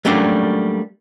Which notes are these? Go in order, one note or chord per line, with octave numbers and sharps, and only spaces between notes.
F#3 G3 A3 A#3 C#4 D4